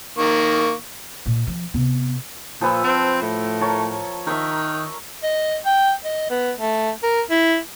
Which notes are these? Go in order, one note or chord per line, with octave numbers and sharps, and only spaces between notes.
D#3 A#3 C#6
A#2
F3
C3 B3
A#2 F3 B4 E6
C4
A2
A#4 C#5 A5
D#3 A#4 E5
D#5
G5
D#5
B3
A3
A#4
E4